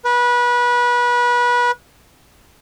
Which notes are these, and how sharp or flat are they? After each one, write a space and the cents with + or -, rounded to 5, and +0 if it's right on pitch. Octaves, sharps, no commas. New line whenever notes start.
B4 -25